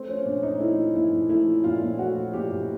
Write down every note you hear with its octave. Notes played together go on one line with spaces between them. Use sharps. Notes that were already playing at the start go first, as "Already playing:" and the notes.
Already playing: A3 C4
F3 C#4
A#2 D4
A#2 D#4
A3 E4
F3
A#2 E4
A#2
A3 E4
F3
A#2 F4
A#2
A3 F#4
F3
A#2 G4
A#2